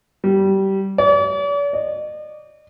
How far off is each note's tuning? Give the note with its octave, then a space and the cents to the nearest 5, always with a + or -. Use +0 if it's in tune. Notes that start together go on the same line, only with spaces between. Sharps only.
G3 -20
D5 -45
D#5 -45